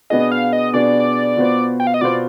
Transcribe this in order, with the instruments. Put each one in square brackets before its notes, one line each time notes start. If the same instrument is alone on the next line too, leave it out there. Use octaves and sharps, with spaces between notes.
[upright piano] B2 B3 D4 G#4 [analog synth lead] D#5
[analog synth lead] F5
D#5
[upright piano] B2 B3 D4 G#4 [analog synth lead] D5
[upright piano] B2 B3 F4 C5
[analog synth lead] G5
F5
D#5
[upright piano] B2 B3 F4 C5 [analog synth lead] D5